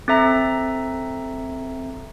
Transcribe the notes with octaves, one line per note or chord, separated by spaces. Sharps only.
C4 A4 E5 A#5